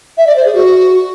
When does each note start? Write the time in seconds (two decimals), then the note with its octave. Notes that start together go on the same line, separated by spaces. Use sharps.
0.18 E5
0.27 D5
0.36 C5
0.45 G#4
0.55 F#4